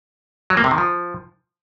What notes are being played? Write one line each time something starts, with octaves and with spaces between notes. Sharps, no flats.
F#3
A#3
C3
D#3
F3